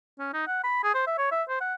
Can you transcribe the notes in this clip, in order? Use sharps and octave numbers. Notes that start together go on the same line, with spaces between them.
C#4
D#4
F#5
B5
G#4
C5
E5
C#5
E5
C5
F#5